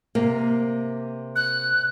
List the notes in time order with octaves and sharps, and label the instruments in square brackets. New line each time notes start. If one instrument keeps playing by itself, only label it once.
[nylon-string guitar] C3 A#3
[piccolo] F#6